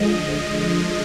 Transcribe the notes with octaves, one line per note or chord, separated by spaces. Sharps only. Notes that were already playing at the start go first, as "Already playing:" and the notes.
Already playing: D3 F3 G#3 D#5